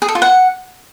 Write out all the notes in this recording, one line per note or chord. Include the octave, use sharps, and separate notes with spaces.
G#4
A4
F4
F#5